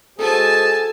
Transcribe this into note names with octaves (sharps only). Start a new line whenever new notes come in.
G#3 F#4 G#4 A4 C5 G#5 A5